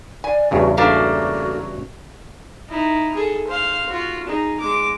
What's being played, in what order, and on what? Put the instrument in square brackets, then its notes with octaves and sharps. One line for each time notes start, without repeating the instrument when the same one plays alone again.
[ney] D5 [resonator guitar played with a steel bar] G#5
[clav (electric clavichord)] E2 G2 C#3 [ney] F#4
[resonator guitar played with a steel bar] A3 A#3 D4 [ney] F#4
[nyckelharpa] D#4 E4
G#4 A4
C5 F5
F4 F#4
D#4 G#4
G#3 D6